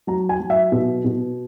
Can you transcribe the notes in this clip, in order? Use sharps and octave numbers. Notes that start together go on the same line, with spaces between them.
F#3 A#5
G#5
F#3
E5
B2
B2